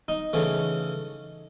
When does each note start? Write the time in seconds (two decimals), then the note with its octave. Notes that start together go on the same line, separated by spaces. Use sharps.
0.08 D#4
0.33 C#3 E3 A3